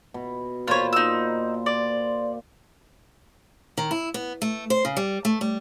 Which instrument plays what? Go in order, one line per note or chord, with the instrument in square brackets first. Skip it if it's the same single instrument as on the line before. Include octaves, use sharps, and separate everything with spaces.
[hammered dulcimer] B2
[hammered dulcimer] A#2 C5 B5 [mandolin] F4 C#5
[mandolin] D#4 E6
D5
[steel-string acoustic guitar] D#3
E4
B3
A3
C5
C#3
G3
A3
G3